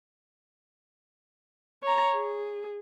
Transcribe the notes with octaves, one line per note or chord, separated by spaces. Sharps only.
C#5 A#5
G#4